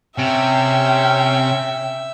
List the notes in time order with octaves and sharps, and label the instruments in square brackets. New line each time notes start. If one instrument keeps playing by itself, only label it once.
[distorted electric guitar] C3 [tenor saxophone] C#4 [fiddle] E5 [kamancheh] G5